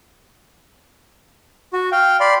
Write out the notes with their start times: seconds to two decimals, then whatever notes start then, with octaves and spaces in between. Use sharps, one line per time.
1.73 F#4
1.92 F5 G5
2.20 D5 B5 C6